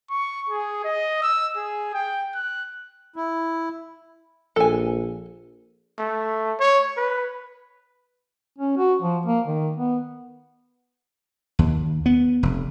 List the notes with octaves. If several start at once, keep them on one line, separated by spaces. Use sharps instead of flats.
C#6
G#4
D#5
E6
G#4
G5
F#6
E4
A#1 A4 G#5
A3
C#5
B4
C#4
F#4
F3
A#3
D#3
B3
D#2
B3
F1